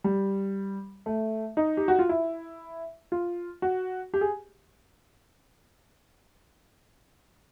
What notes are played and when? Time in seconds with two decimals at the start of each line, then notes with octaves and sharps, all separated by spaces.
0.04 G3
1.06 A3
1.57 D#4
1.77 G4
1.88 F#4
1.99 F4
2.09 E4
3.12 F4
3.62 F#4
4.14 G4
4.21 G#4